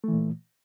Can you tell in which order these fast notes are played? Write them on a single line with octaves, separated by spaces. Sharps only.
A3 E3 A#2